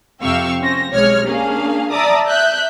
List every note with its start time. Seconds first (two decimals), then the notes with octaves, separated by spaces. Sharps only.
0.21 F2 C3 F5 G5 C#6 E6
0.61 C#4 C5 A#6
0.91 B1 C3 G#3 C#5 F6
1.26 A#3 C#4 D4 G#4 F5
1.91 D5 E5 A5 A#5 D6 D#6
2.27 E5 F#6 G6